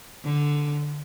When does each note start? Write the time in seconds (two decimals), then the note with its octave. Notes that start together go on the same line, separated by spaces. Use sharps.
0.25 D3